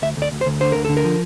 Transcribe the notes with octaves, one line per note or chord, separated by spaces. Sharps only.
D2 E5
D2 D5
D2
C5
D2
D3 C5
D2 A#4
D3 A4
A#4
F3